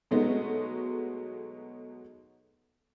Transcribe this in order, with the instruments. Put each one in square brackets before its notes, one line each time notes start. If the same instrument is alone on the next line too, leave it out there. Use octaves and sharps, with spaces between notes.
[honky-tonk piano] B2 F#3 G#3 A3 B3 D#4